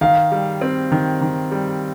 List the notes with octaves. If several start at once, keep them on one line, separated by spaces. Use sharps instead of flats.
D#3 F5
G3
C4
D#3
D#3
G3